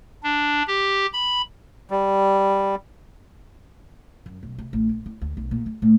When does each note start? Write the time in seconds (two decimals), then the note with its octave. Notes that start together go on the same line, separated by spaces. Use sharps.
0.23 D4
0.68 G4
1.13 B5
1.91 G3
4.26 F#2
4.43 B1
4.58 C3
4.73 A1
4.89 A#1
5.06 E4
5.21 D2
5.37 B1
5.51 A#2
5.66 G#3
5.82 A2